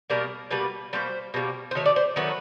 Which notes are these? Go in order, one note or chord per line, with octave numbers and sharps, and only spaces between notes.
B2 G3 A#3 A#4
B2 G3 A#3 B4
B2 G3 A#3 C5
B2 G3 A#3
C5
D#3 F#3 A3 C#5
D5
C5
D#3 F#3 A3 B4